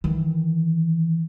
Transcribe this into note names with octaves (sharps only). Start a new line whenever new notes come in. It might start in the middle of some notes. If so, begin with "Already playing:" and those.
D#3 E3